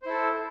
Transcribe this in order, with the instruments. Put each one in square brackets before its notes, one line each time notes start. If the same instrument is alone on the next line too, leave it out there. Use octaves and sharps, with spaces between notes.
[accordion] C5
E4
A4